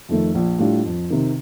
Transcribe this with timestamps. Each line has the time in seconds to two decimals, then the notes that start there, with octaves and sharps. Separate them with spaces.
0.09 F2 D#3 A3
0.35 A#1
0.59 A2 G3 D4 F4
0.85 F2
1.10 C3 D#3